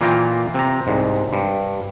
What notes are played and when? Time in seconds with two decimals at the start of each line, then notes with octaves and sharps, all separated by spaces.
0.01 A#2 E3 A#3 F4 G5 A#5
0.54 C3 A#5
0.87 C2 G#2
1.33 G2